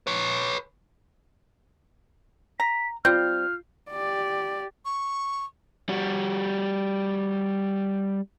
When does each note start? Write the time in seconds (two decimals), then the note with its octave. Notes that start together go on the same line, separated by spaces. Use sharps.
0.07 B4 C#5
2.60 A#5 B6
3.05 G3 C4 F4 F6 G6
3.91 G4 D5
4.85 C#6
5.89 G3 F#4